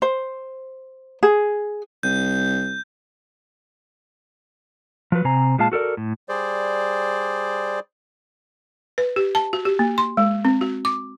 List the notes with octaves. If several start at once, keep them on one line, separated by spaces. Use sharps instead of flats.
C5
G#4
C2 G6
F3 F#3 B4
C3 C4 C5 G#5 A#5
A#2 G#3 F4 F5 A5
F#4 A4 A#4 D5
A2
G3 G#4 C5 D5
B4
G4
A5
F#4
G4
A#3
C6
G#3
C4
F#4
D6